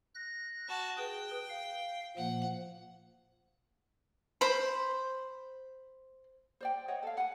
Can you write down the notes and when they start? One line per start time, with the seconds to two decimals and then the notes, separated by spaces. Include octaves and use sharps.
0.15 F#6 A#6
0.68 F#4 A5
0.97 G#4 B4 G5
1.49 F5
2.17 A#2 F3 A#3 F#5
4.41 C5 B5
6.61 C5 D5 G5
6.88 C#5 D#5 F#5
7.03 A4 F5
7.17 F#5 G#5